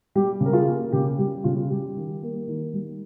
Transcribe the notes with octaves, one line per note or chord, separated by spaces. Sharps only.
G3 G4
C#3
A#4
F4 G#4
A#3
C#3 G4
G3 G4
C#3 F4
G3 G4
D#3
A#3
D#3
G3